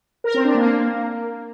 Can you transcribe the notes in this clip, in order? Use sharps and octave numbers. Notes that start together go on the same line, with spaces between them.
A#4
C4
D4
A#3